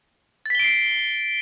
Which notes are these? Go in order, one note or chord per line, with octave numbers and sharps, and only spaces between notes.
A6 B6 C7 D7 G7